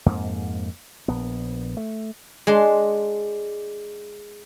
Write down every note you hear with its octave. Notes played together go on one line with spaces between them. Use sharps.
F2 G#2 A#3
A#1 B3
A3
G#3 D4 C6